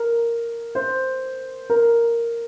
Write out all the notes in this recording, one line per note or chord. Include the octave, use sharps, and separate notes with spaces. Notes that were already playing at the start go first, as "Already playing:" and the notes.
Already playing: A#4
C5
A#4